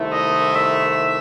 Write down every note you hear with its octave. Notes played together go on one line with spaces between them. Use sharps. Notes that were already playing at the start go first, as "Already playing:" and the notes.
Already playing: C2 C3 D#3 A3 E4
D#5
E5